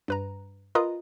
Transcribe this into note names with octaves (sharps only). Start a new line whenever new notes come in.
G2 B4 A#5
F4 A#4 B4 D#5 A#5 D#6